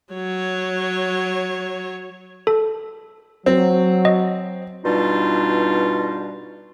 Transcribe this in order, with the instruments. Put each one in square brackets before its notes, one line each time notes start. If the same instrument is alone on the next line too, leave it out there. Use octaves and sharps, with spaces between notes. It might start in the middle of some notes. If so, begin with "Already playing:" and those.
[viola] F#3 C#5
[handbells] A4
[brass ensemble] F#3 [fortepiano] C4
[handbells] D#5
[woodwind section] G2 B2 G3 D4 D#4 F4